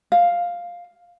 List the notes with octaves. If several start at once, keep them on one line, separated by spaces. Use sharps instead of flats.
F5